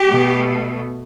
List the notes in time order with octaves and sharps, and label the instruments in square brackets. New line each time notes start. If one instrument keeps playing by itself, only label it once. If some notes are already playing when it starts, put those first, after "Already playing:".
Already playing: [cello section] G4
B2 A3